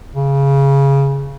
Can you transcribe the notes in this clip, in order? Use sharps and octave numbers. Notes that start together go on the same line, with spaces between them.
C#3